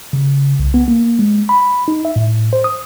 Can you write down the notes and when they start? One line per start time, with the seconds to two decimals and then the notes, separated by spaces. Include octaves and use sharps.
0.13 C#3
0.59 C2
0.74 B3
0.88 A#3
1.19 G#3
1.49 B5
1.88 D#4
2.05 E5
2.16 A2
2.53 C5
2.64 D#6